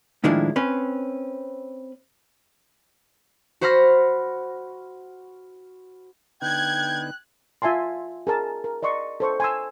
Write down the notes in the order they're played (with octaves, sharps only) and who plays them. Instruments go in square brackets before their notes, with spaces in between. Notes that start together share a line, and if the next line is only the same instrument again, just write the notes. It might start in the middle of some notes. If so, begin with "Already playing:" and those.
[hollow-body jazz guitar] A2 D#3 F3 G#3 D4 E4
C4 C#4 B4
[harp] F#4 C5 F#5 B5 F6 A#6
[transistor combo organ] D3 B3 D#4 [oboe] G5 [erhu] F#6 [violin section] G#6
[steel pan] F4 E5 G#5 A5 C6
G#4 A#4 A5
A#4
D5 D#5 C6 C#6
A4 C5 C#6
G#5 C6 E6